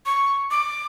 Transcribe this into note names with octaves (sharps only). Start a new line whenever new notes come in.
C#6
D6